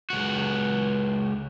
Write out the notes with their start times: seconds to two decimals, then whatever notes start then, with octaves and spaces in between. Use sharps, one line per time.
0.10 C#2 F#4